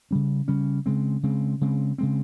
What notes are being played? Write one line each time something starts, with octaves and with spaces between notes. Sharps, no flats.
C#3 G3 C#4
C#3 G3 C#4
C#3 G#3 C4
C#3 G#3 C4
C#3 G#3 C4
C#3 G#3 C4